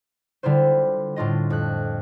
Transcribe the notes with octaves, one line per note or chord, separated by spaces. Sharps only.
D3 G3 E4 F4 C5
A2 D4 F4 D#5
F2 F#6